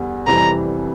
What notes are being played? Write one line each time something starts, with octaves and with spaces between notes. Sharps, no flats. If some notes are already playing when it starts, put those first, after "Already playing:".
Already playing: E2 D3 G3
F1 F2 E3 G3 C4 A#5